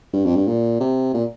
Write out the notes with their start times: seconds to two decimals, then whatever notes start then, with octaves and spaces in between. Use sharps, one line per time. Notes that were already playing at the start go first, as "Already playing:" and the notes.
0.13 G2
0.25 F2
0.36 G2
0.47 A#2
0.80 C3
1.14 A#2